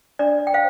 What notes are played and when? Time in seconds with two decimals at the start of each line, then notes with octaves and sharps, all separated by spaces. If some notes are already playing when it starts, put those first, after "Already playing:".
0.19 D4 D5
0.47 G5
0.54 C5 F5